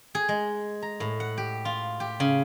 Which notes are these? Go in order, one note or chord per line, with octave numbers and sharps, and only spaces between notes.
G#4
G#3
A#5
A2
F#5
G4
F4
G4
C#3